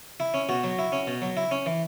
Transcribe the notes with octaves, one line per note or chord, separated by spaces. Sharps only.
E4
C#4
B2 F#4
F#3
E4
C#4
B2
F#3
E4
C#4
E3